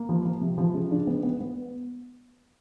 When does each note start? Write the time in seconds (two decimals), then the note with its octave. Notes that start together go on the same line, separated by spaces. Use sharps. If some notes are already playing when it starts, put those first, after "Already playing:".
Already playing: A#3
0.09 F3
0.25 F3
0.41 C3
0.58 F3
0.75 C#3
0.91 D4
1.07 B3
1.23 B3
1.41 B3